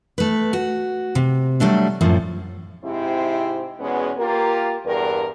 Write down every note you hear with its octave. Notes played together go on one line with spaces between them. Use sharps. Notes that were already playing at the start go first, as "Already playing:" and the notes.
A3 B4
F#4
C3
F#3 G3 A3 D4
F#2 A2 F3
G#2 C3 C4 E4
E2 B2 G#3 B3 C#4
A#3 F4 G4 A#4
E2 G2 A#4